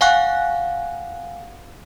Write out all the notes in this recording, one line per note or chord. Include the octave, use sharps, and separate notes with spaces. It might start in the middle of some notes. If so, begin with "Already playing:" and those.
F5 F#5 G#5 C#6 F#6